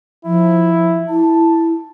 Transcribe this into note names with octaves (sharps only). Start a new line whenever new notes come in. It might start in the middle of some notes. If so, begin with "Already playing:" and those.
F3 E4
E4 A5